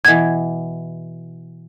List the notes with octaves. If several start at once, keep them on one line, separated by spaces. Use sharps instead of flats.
B2 E3 G#6